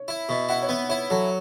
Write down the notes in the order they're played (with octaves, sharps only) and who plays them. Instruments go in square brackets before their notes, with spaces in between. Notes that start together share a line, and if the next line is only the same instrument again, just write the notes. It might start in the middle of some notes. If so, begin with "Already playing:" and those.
Already playing: [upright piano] C#5
[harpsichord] E4
[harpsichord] B2 [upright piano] E5
[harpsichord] E4 [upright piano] F#5
[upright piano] C#5
[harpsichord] B3 [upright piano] E5
[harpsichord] E4 [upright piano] C#5
[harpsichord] F#3 [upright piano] A4